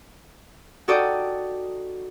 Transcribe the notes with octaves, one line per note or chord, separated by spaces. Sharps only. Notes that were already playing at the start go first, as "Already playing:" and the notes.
D#4 F#4 A4 D5 G5 D#6